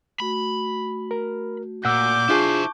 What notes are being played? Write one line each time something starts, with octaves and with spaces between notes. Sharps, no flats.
A3 F#4 B5
A#4
A#2 F#5 D6 E6 G6
D4 E4 F4 G#4 C5 A5 C#6